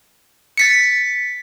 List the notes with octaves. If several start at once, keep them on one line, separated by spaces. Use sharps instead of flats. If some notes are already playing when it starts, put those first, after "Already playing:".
A6 B6 C#7